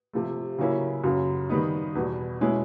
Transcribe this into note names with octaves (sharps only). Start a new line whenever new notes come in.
C3 F3 A3
C#3 F#3 A#3 C#4 E4
F#2 C#3 F#3
D#3 G3 B3 D#4
E2 B2 G3
B2 G#3 C#4 E4